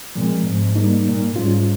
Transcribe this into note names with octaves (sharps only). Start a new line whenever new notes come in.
A#2 F3 G#3 C4
G#2
G3 A#3 D#4
A#2
G#2 G3 C#4 F4